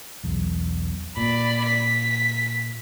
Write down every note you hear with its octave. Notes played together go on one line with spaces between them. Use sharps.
B1 E2
A#2 D5 B5
B6